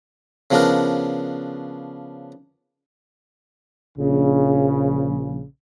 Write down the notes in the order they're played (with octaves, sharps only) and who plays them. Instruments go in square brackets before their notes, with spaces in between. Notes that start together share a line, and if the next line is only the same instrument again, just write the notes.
[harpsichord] C#3 F3 B3 D4 A#4
[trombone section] A#1 C#3